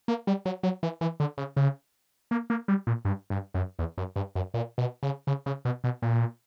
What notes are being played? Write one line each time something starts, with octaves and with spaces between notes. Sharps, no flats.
A#3
G3
F#3
F#3
E3
E3
D3
C#3
C#3
A#3
A#3
G3
A#2
G2
G2
F#2
E2
F#2
G2
F#2
A#2
B2
C#3
C#3
C#3
B2
B2
A#2